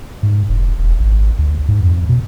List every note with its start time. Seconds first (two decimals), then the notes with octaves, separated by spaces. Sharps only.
0.23 G#2
0.49 F1
0.79 E1
1.00 G#1
1.39 D2
1.68 G#2
1.83 F2
2.09 B2